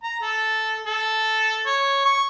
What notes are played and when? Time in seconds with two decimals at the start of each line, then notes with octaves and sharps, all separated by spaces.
0.03 A#5
0.22 A4
0.87 A4
1.66 C#5
2.06 C#6